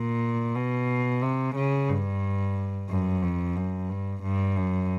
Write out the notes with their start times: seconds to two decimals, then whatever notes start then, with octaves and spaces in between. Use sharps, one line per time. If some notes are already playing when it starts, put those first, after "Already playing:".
Already playing: A#2
0.56 B2
1.22 C3
1.56 C#3
1.89 G2
2.90 F#2
3.23 F2
3.56 F#2
3.90 G2
4.23 G2
4.57 F#2